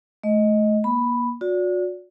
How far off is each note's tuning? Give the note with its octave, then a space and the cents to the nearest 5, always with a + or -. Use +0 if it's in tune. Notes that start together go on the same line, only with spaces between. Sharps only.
A3 -30 D#5 +10
A#3 +35 B5 +0
F#4 -40 D5 -25